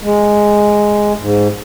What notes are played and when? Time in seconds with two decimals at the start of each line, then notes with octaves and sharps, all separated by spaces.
0.03 G#3
1.19 G#2